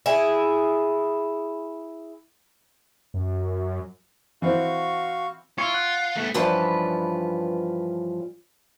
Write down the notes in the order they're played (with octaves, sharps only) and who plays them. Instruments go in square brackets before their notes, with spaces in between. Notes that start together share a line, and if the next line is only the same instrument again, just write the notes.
[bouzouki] E4 G#4
[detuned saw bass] F#2
[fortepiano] E3 C4 [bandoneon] F#4 F5 C#6
[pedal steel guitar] E4 C#5 [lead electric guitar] F4
[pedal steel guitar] F#5
[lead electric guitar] A3 B3
[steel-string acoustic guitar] G2 E3 F3 C#4 B4 A5